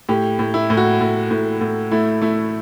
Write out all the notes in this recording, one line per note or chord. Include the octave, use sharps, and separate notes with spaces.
A2 G4
A2
E4
A2
F#4
A2
A2
A2
A3 E4
A3 E4